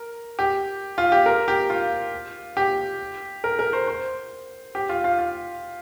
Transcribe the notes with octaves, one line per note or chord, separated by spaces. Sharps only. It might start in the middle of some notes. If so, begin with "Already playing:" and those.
Already playing: A#4
G4
F4
G4
A#4
G4
F4
G4
A#4
A#4
C5
C5
G4
F4
F4
F4